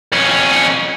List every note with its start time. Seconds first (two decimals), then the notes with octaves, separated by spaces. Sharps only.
0.12 F2 C#4